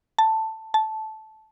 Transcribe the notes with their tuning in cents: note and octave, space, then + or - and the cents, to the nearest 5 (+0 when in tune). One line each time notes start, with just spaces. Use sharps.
A5 +10
A5 -10